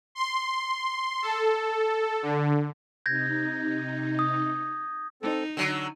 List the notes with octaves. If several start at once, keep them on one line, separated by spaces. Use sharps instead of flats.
C6
A4
D3
C3 D#4 G6 G#6 A#6
D#6
C4 D#4 A4
D3 F#3 E6